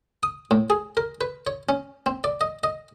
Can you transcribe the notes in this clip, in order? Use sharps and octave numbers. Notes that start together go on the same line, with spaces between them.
D#6
A2
G#4
A#4
B4
C#5
C#4
C4
D5
D#5
D#5